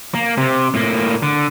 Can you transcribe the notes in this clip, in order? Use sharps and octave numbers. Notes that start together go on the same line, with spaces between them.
A#3
C3
A2 A#3
D3